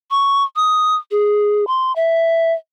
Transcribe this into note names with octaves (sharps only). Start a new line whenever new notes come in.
C#6
D#6
G#4
C6
E5